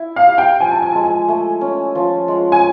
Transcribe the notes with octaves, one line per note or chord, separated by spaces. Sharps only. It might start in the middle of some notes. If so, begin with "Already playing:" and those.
Already playing: E4
F5
G4
G5
F3 G#5
A5
G#5
G#3 A5
G#5
A3 G#5
C#4
F3
G#3
G#5